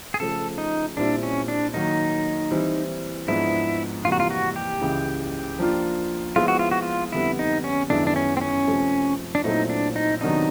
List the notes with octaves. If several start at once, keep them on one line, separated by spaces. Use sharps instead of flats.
G#4
C#3 F3 A3 A4
D#4
A#2 G3 C4 D4 E4
C#4
D4
D#3 F#3 A#3 D#4
E3 G3 C4 E4
G#2 F3 G#3 B3 D4 E4
F2 C3 E3 G3 A#3 F4
F#4
F4
F#4
G4
C#2 C#3 E3
F3 A#3 D4 F4
F3 G#3 B3 E4 F4 G#4
F#4
F4
F#4
F4
F2 D3 G3 B3 E4
D#4
C#4
F#2 D#3 G#3 B3 D4 E4
D4
C#4
C4
C#4
C3 F3 A3
D4
A#2 F#3 A3 C4 D#4 E4
D4
D#4
C3 D#3 F#3 B3 D4 D#4